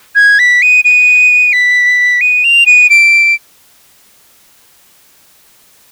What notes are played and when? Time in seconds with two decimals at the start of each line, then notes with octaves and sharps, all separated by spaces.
0.16 G#6
0.39 B6
0.62 D#7
0.85 D#7
1.53 B6
2.21 D#7
2.44 F7
2.66 D#7
2.90 D7